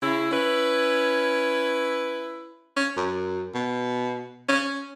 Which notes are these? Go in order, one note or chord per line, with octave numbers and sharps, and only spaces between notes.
C#3 E4
C#4 E4 B4
C#4
F#2
B2
C#4